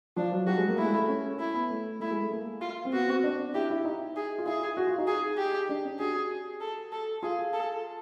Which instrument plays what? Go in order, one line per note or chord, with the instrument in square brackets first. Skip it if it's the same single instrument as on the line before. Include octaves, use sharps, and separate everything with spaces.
[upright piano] F3 [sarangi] D4
[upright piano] F#3
[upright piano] G3 [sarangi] F#4
[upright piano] G#3
A#3
[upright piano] A3 [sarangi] E4
[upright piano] G#3
A3
C#4
[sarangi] E4
[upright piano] B3
A3
[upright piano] A3 [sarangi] E4
[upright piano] G#3
A3
A#3
[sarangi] F4
[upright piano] C4
[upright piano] B3 [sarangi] F#4
[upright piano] C4
D4
[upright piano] E4 [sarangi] G4
[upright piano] E4
D#4
[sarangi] G#4
[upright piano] F4
[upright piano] E4 [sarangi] G#4
[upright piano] F#4
F4
D#4
[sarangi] G#4
G4
[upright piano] D4
C#4
[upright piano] F#4 [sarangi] G#4
[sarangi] A4
A4
[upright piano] F4 [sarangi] G#4
[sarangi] A4